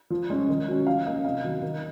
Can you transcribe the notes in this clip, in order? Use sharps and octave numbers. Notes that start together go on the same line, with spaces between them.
F3
G#3 C#4
D#3
F#3 C#4
F3 F5
A#3 C#4 D#5
C3 F5
D#3 F#3
D#3